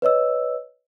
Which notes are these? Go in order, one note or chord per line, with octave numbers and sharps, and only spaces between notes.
B4 C#5 D#5 E6